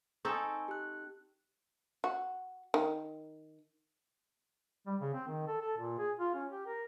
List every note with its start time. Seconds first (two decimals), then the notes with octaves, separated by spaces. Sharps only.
0.25 C4 D#4 A4 G#5 C#6
0.68 G4 F#6
2.04 F#4
2.74 D#3
4.87 G3
5.01 C#3
5.14 C4
5.27 D#3
5.47 A4
5.61 A4
5.78 A#2
5.99 G#4
6.19 F4
6.35 C#4
6.50 G4
6.67 A#4